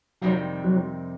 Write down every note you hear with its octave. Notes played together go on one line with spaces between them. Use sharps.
F2 C3 D#3 F#3 G3 C4
F#3